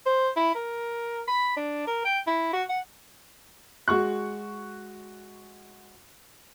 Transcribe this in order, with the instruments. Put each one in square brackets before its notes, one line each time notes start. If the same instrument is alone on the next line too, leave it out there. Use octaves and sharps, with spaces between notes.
[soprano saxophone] C5
E4
A#4
B5
D4
A#4
G5
E4
F#4
F#5
[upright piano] G#3 F#4 C#6 F#6